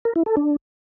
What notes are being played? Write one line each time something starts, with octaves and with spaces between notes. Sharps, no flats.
A#4
E4
A4
D4